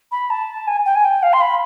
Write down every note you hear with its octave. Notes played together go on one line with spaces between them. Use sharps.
B5
A5
G#5
G5
G#5
G5
F5
C6
B5